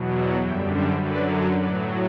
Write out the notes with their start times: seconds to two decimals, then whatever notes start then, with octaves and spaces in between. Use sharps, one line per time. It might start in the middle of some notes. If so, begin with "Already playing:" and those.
Already playing: E2 B2 F#3
0.16 D5 F#5
0.44 F#2 D3 G3 E5 G5
0.73 C5 E5
1.02 F#2 D3 F#3 B4 D5
1.59 A2 F#3 B4 D5